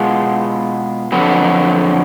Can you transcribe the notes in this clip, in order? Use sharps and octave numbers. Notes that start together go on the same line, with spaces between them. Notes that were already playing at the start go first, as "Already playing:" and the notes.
Already playing: B2 G#3 B3 F4
F2 D3 F#3 B3